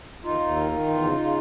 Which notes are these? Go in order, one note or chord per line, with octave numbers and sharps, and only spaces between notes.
D#2 D#4 F4
D#2
D#3
D#3
E2
C#3
C#3